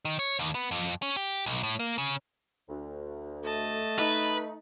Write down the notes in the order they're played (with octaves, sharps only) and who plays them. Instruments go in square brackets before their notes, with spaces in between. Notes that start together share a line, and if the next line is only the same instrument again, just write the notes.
[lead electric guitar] D#3
C#5
D#2
B3
F2
C#4
G4
B1
A2
A#3
C#3
[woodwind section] D2
[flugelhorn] A3 [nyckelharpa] D#5 A5
[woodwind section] D#4 [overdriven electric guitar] B4